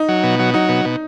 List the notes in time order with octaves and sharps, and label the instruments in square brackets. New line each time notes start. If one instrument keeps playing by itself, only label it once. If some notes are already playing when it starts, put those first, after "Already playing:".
Already playing: [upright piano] D#4
[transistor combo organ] F#3
B2
F#3
[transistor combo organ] F#3 [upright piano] D#4
[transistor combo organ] B2
B2